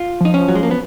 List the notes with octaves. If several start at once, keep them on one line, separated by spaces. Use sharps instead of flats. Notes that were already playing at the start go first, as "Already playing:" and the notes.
Already playing: F4
F3 D#4
C#4
F3 F#3
G#3
A#3
B3